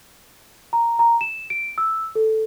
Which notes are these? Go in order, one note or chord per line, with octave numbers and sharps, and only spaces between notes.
A#5
A#5
E7
D7
E6
A4